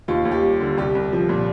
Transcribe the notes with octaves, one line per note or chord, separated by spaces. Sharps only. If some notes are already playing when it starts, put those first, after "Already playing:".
D#2 F4
D#2
G4
G3
D3
C2 G4
C2
F3
A#2